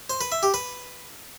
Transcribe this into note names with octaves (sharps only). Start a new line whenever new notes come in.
C5
B4
E5
G4
B4